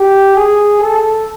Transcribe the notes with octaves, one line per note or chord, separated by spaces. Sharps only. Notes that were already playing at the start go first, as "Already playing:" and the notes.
Already playing: G4
G#4
A4